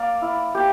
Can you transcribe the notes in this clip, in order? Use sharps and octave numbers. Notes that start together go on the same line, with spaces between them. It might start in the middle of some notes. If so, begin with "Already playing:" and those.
Already playing: A#3 D5 F5
E4
A#3 G4